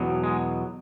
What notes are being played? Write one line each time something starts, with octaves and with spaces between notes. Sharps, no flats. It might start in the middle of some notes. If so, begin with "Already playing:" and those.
Already playing: E2 B2 F#3
G#3